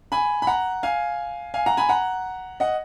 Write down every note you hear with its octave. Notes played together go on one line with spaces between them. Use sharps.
G#5 B5
B5
F#5 A#5
F5 G#5
F5 G#5
F#5 A#5
G#5 B5
F#5 A#5
D#5 F#5